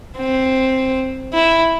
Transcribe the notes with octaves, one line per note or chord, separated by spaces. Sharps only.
C4
E4